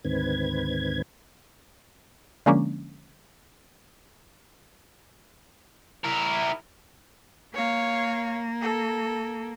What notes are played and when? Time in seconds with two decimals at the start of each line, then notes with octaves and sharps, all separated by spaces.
0.05 D2 G#2 D#3 C4 B4 G#6
2.46 D3 F3 G#3 A#3 C#4 D4
6.04 E4 A#4
7.54 A#3 C#5 F5
8.61 A4